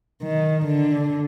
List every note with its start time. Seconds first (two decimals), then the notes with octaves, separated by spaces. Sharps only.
0.22 D#3
0.65 D3